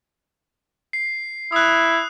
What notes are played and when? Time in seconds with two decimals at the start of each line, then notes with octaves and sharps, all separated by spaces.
0.93 C7
1.52 E4 D#6 F#6